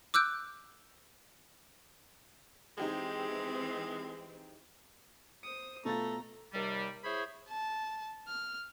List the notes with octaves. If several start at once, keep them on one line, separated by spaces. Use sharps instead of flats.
D6 E6 F#6 G6 D7
E3 G#3 C4 D#4 G4 G#4
C5 D#6 C#7
B2 A3 F4 A#5 A6
D#2 C3 G3
E4 G#4 C5 C#5 B5
A5
F6